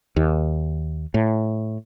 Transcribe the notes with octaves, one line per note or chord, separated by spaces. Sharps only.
D#2
A2